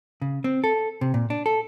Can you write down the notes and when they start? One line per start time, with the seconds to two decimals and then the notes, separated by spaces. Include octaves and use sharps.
0.22 C#3
0.44 C4
0.64 A4
1.01 C3
1.14 A#2
1.30 D4
1.46 A4